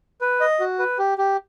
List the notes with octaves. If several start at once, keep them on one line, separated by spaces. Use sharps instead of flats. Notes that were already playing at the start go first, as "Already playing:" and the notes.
B4
D#5
F#4
B4
G4
G4